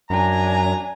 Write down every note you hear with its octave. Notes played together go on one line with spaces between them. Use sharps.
F#2 D4 G#5 A#5